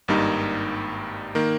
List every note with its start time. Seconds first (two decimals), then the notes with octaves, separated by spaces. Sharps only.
0.08 G#1 G2 G3 A#3 D#4
1.35 D#3 A#3